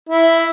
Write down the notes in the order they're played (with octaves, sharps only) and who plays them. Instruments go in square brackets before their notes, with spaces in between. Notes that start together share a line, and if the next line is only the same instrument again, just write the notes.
[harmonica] E4